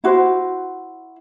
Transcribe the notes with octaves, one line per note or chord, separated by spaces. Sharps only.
E4 F#4 C5